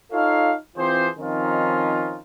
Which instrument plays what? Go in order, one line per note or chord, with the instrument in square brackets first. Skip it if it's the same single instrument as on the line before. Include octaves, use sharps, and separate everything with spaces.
[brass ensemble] D#4 F4 A4 C#5 F5
E3 C4 F4 G4 G#4 C5
D#3 F3 C4 C#4 D#4 F4